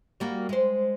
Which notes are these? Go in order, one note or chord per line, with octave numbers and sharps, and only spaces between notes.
G3 A#3 F#4
G#3 C5